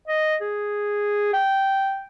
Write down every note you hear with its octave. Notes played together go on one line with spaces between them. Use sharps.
D#5
G#4
G5